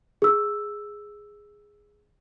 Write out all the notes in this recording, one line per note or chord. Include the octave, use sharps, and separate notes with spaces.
G#4 E6